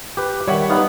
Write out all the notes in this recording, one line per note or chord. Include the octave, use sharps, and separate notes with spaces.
G4 B4
D#3 G3 C#5 E5 F#5
B3 D#4 F5